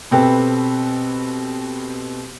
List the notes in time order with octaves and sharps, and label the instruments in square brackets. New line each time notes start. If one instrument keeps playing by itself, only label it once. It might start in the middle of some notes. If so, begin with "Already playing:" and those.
[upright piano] B2 C4 G4 A4 B4